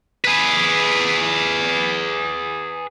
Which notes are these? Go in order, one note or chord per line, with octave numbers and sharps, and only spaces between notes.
G#4 B4